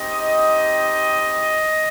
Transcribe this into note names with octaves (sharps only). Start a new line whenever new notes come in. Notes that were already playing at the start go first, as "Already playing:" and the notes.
Already playing: C4 D#4 G4 D#5